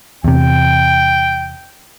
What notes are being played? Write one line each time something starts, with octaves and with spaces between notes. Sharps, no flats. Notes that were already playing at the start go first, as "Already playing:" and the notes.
E2 C3 G5